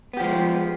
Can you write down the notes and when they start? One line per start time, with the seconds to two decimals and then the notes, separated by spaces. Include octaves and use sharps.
0.13 B3
0.17 G4
0.20 F3
0.24 G#3